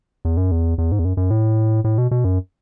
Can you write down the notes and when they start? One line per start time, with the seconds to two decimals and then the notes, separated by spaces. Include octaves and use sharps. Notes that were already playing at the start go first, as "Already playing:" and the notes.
0.25 E2
0.37 F#2
0.51 E2
0.78 E2
0.92 G#2
0.99 E2
1.05 F#2
1.17 F#2
1.31 A2
1.84 A2
1.98 B2
2.11 B2
2.24 F#2